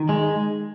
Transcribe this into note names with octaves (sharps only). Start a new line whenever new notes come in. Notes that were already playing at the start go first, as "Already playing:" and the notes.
Already playing: D#3
G#3